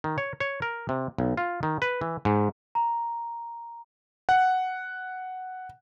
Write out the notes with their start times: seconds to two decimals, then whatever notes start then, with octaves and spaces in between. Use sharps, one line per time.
0.04 D#3
0.18 C#5
0.40 C#5
0.62 A#4
0.89 C3
1.18 B1
1.37 F4
1.63 D#3
1.82 B4
2.01 E3
2.25 G#2
2.75 A#5
4.29 F#5